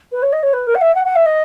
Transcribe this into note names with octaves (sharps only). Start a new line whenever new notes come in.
B4
C#5
D#5
C#5
B4
A#4
F#5
E5
F#5
F#5
E5
D#5